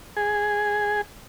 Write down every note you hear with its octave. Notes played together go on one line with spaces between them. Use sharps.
G#4